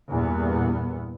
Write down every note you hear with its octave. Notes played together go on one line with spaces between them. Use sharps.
E2 G2 A#2 B3